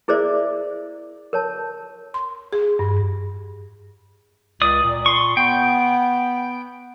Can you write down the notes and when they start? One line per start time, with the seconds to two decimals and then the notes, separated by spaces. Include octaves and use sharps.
0.08 E4 G#4 A#4 C5 D5 E5
1.33 A#4 C#5 A5
2.14 C6
2.53 G#4
2.79 G2
4.62 C#2 D5 D#6
4.84 A#2
5.06 C6 C#6
5.37 B3 G5